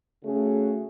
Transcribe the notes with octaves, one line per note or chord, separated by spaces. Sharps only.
C#3 A3 F#4 G#4